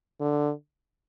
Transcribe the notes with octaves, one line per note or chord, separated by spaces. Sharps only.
D3